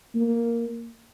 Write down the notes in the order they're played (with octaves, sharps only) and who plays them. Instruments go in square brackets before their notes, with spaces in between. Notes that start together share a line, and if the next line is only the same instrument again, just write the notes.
[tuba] A#3